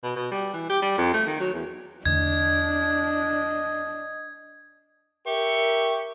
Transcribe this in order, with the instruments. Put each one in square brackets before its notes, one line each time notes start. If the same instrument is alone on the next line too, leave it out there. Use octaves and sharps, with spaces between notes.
[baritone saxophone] B2
B2
G3
E3
G4
G3
F2
A3
D#3
F#3
E2
[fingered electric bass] E2 D3 A3 [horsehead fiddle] D4 [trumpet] D#5 [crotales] G#6
[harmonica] G4 C#6 [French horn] A#4 [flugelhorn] E5